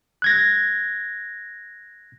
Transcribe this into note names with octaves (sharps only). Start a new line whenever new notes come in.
F#6 G#6 A#6